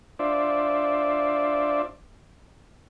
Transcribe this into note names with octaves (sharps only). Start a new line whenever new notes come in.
D4 F4 C5 D5 E5